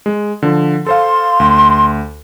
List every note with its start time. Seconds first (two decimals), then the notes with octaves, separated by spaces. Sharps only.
0.06 G#3
0.42 D3 F3
0.86 A4 C5 F5 C6
1.40 D2